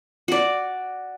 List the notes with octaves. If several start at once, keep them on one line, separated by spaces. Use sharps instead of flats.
F#4 D5